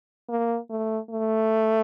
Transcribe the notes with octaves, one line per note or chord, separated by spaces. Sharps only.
A#3
A3
A3